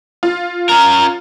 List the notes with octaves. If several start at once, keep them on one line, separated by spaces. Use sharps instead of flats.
F4
C#4 A#4 A#5